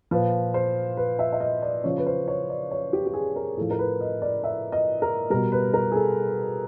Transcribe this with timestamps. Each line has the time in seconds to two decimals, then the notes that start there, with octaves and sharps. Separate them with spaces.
0.11 A#2 F3 B4
0.54 C5
0.97 B4
1.19 E5
1.33 E5
1.40 D#5
1.62 D5
1.84 C#3 F3 C#5
1.98 B4
2.06 C5
2.28 C#5
2.50 D5
2.71 C#5
2.93 G4
3.07 G4
3.14 G#4
3.36 A#4
3.57 A2 F3 A4
3.70 A#4
3.79 B4
4.01 D#5
4.22 D5
4.44 E5
4.72 D#5
5.02 A#4
5.30 B2 G3 A#4
5.52 B4
5.74 A#4
5.92 G#4
5.96 A4